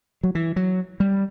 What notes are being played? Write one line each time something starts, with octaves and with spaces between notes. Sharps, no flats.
F#3
E3
F#3
G3